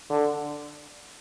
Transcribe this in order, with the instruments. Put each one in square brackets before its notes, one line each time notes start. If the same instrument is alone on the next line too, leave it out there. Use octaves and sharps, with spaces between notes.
[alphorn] D3